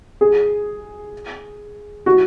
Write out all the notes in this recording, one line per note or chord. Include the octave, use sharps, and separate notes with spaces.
G#4
F#4